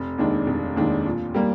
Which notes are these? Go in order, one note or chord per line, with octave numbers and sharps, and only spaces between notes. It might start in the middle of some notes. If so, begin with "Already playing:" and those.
Already playing: F1
D#2 D#3 G#3 D4
F1
D#2 D#3 G#3 D4
A#2
G3 A#3